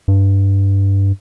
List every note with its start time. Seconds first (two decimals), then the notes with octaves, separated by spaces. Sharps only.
0.08 G2